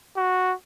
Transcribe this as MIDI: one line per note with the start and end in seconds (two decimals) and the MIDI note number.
0.17 0.53 66